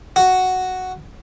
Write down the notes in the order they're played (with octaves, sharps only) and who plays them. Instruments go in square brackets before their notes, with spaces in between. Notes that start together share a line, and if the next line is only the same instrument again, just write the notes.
[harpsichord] F#4